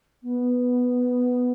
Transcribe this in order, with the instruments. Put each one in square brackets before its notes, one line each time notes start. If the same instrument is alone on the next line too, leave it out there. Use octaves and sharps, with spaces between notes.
[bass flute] B3